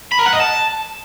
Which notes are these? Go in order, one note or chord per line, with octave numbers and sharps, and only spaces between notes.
B5
A#4
F#5
D#5
A5